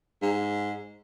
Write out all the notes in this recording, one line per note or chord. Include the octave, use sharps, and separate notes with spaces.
G#2